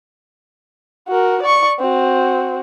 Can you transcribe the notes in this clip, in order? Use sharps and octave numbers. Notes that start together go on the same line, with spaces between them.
F#4 A#4
D5 C#6
C4 F#4